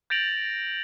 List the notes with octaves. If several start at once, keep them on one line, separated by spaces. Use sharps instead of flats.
G6 A6 A#6 D7 F7 F#7